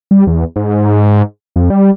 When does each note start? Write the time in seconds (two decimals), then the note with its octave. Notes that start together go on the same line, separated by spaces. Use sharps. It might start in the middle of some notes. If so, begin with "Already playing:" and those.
0.11 G3
0.27 E2
0.56 G#2
1.56 F2
1.70 G3